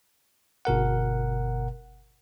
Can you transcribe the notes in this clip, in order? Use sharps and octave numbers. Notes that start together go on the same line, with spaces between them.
G1 B2 A#4 F#5